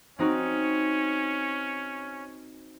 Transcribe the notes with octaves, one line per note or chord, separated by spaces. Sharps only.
C4 C#4 D#4 F#4